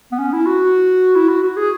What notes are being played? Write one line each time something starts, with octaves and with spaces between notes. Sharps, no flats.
B3
C#4
E4
F#4
E4
F#4
F#4
G#4